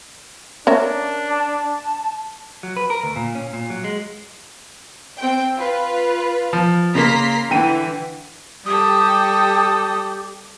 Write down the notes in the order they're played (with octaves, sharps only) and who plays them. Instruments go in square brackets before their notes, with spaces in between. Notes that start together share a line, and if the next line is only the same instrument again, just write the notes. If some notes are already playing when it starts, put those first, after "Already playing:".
[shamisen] C#4 A#4 E5 [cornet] D4
[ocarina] A5
[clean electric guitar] F#3
B4
A#4
D2
A#2
C#4
A#2
F#3
G#3
[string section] C4 G5
F4 B4
[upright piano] F3
[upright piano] C#3 A#3 [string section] A#5 C6 B6
[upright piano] D3 G5 D#7 [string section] E3
[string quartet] G3 A4 [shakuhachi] G4 [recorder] D#6